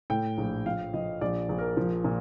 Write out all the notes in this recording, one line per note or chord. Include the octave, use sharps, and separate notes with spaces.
A2 G5
A#1
F3 F5
F3 D#5
A#1 D5
A#1
A#4
F3
A#2